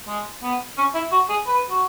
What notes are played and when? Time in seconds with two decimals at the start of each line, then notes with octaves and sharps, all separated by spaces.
0.08 G#3
0.42 B3
0.78 C#4
0.95 E4
1.12 F#4
1.29 G#4
1.47 B4
1.70 F#4